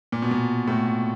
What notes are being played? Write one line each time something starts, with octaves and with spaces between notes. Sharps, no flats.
A#2
B2
A#2
A2